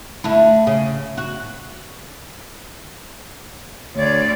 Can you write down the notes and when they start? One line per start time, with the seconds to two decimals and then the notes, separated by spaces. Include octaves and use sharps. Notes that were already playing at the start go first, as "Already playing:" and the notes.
0.24 D3 A3 E4
0.67 C#3
1.17 F#4
3.96 D2 C#5 D5